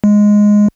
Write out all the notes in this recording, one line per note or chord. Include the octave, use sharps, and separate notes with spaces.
G#3